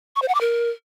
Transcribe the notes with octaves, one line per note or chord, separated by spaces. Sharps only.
C#6
C5
F#5
D6
A#4